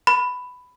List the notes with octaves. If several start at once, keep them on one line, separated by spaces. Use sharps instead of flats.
B5